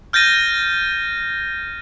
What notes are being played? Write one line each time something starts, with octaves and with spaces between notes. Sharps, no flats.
F6 G6 A6 A#6 D#7